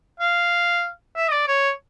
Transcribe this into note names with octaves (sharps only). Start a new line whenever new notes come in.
F5
E5
D#5
D5
C#5